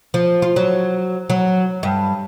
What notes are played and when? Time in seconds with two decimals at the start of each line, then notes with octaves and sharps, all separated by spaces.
0.14 F3
0.42 F4
0.56 F#3
1.30 F#3
1.83 G2